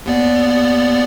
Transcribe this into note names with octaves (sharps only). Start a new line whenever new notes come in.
D#2 B3 D5